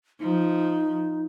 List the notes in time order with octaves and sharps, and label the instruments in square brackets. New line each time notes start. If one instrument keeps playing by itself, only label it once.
[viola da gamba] F3 [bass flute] D#4